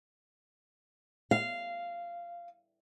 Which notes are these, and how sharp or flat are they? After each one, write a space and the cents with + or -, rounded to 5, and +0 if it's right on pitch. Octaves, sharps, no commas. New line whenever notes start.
F5 -10